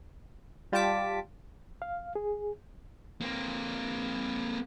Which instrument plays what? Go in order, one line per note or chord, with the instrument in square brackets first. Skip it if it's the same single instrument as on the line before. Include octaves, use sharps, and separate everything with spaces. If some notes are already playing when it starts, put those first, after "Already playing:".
[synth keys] G3 F4 G4 A5 D6 B6
[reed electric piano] F5
G#4
[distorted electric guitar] A#3 C4